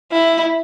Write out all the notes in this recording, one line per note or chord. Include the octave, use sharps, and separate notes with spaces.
E4